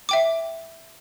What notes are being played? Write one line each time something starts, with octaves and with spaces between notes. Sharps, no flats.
E5 G5 D6